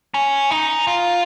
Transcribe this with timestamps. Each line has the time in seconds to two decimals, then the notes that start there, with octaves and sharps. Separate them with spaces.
0.14 C#4
0.51 D#4
0.87 F4